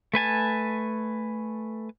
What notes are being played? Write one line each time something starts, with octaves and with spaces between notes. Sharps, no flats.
A3 B4 G#5 A5